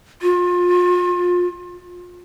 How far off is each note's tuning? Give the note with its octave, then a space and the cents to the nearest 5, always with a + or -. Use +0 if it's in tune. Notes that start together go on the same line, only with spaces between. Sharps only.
F4 +30